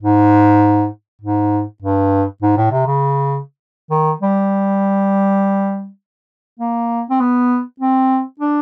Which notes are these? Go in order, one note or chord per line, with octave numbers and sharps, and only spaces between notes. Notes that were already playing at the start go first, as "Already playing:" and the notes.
G#2
G#2
G2
G#2
A2
C3
C#3
D#3
G3
A#3
C4
B3
C4
D4